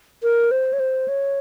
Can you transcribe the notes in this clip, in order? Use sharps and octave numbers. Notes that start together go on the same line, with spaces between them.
A#4
C5
C#5
C5
C#5